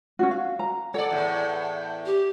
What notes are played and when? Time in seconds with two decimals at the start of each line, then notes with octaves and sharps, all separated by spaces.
0.19 C#4 D4 F#4
0.31 F5
0.59 A#5
0.94 A4 C#5 D5 F#5
1.10 E2 A2
2.06 G4